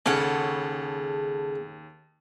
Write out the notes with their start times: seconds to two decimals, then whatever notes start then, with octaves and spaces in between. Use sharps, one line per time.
0.06 D#2 C#3 C#4 A4 F#5